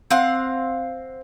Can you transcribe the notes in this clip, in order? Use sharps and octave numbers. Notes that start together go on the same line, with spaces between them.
C4 F5 F#5